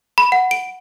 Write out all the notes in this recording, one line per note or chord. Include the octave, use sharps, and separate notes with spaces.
B5
F#5
D7